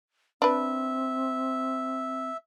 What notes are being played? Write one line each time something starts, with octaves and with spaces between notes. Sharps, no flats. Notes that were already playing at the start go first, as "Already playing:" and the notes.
C4 D4 B4 E5